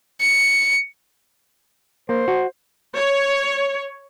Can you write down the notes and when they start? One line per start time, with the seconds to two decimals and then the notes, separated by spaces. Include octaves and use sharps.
0.21 C#7
2.09 A#3 C5
2.28 F#4
2.96 C#5